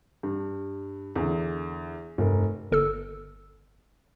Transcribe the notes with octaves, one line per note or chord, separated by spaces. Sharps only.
G2
E2 D3
F1 G2 A#4
G1 A4 E6